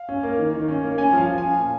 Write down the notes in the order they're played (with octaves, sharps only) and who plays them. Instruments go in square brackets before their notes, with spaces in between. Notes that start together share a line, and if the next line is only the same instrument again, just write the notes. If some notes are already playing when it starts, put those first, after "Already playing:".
Already playing: [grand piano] F5
C#4
A#3
D#3
D#3
C#4
A#3
C#4 G#5
F3 F5
F3
C#4 G#5
A#2